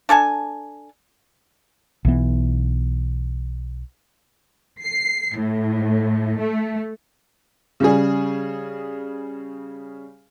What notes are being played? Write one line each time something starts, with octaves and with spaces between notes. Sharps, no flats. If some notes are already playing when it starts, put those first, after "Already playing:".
D4 A4 G#5 A5
B1 E3 B3
C7
A2
A3
C#3 G3 G#4